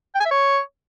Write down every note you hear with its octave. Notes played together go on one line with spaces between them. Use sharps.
G5
G#5
E5
C#5